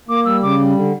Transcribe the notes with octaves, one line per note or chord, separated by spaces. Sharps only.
A#3 D6
G3 E6
C#3 D6
G3
D3